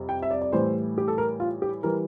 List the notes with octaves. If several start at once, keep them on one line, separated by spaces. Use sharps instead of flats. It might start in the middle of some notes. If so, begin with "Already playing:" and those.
Already playing: F2 C3 G3
G5
E5
D5
D5
A2 E3 G3 C5
G4
A4
A#4
F4
G4
E3 G3 A#4